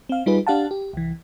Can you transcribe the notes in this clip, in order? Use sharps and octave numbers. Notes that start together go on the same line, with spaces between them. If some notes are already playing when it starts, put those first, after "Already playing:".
C4 F5
G3 D#4 F4 G#4 B4
D4 G4 F5 F#5 A5
G4
C2 E3